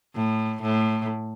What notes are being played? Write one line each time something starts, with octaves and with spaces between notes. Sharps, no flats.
A2
A2